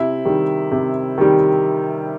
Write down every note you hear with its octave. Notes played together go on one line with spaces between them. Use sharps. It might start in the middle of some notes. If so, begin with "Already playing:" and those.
Already playing: C3 E4
D#3 G3
C3
D#3 G3